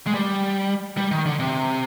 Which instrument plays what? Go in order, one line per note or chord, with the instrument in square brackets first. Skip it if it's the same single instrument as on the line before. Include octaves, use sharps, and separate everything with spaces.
[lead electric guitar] G#3
G3
G3
D#3
D3
C3